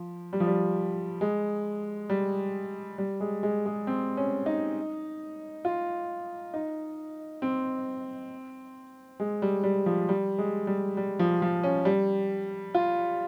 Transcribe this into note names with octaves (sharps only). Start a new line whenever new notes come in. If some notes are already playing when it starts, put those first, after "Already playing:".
Already playing: F3
G3
F3
G3
G#3
G3
G3
G#3
G#3
G#3
C4
C#4
D#4
F4
D#4
C4
G#3
G3
G3
F3
G3
G#3
G3
G3
F3
F3
C#4
G3
F4